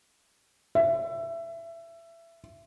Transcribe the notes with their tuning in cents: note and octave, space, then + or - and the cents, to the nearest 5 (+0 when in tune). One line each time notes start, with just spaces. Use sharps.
E5 +20